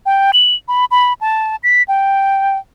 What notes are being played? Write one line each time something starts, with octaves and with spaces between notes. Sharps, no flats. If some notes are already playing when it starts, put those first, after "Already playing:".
G5
F#7
B5
B5
A5
B6
G5